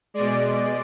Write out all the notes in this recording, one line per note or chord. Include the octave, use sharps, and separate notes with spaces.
B2 G#3 D5